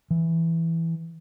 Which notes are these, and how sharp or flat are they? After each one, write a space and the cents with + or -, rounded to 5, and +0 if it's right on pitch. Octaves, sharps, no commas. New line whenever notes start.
E3 +0